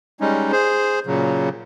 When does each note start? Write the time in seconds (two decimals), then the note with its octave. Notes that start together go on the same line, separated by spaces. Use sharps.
0.21 G3 G#3 C#4 D#4
0.52 G#4 C5
1.06 A#2 C#3 F#3